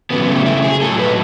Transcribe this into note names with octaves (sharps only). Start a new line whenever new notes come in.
C#3 F#3 B3
B3
A3
E4
G#4
A2 F#3 A4
B4